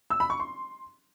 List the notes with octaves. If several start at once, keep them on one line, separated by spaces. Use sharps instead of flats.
E6
B5
C#6
C6